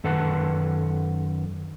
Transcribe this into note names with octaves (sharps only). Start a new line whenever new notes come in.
F#2 D#3 A4 B4 F#5 A5